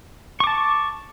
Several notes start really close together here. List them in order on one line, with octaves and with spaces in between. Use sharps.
C#6 D6 A5